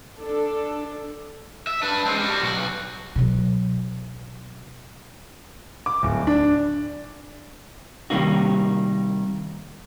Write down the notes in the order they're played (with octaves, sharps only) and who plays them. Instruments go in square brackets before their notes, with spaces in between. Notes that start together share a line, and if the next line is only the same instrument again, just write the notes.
[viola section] D4 A4
[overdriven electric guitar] E5
D4 B4
G#3 C4
G3 F#4
B1 F#4
[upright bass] B2 F#3
[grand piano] D6
D1
D4
[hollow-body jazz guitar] C3 D#3 G3 A#3 D#4 F#4